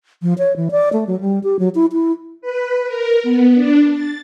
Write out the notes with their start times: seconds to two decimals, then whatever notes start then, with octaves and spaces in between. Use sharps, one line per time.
0.22 F3
0.38 C#5
0.56 E3
0.71 D5
0.93 A3
1.07 F#3
1.21 G3
1.44 G4
1.59 F#3
1.75 E4
1.93 E4
2.42 B4
2.87 A#4
3.23 B3
3.55 D4
3.92 A6